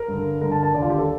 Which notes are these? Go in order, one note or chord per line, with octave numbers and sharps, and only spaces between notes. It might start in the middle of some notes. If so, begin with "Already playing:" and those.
Already playing: A#4
G2 D3
G2 D3 A#4
A5
A5
D#2 D3 D5
F4
G4
A4